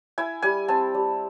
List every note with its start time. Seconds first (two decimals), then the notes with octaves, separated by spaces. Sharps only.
0.18 E4 G#5
0.42 G3 G#5
0.68 C4 A5
0.94 G3